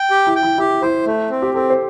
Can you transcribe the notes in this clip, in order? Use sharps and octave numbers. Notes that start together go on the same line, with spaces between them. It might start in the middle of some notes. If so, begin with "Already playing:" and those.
Already playing: G5
G4
E4
G5
E4
E4 G4
E4 C5
A3
C4
G4
C4 A4
C5